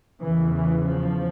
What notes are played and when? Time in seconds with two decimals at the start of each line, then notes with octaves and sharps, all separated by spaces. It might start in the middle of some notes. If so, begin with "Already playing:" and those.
0.22 E2 C#3 E3
0.55 E3
0.86 F3